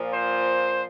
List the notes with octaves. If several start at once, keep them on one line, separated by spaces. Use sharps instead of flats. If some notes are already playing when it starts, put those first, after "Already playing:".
Already playing: A#2 F3
C5